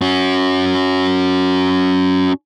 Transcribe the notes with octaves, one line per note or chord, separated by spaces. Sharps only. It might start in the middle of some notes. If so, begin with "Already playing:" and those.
C#4 F#4